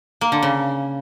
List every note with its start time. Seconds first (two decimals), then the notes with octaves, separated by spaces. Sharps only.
0.21 A#3
0.32 D3
0.43 C#3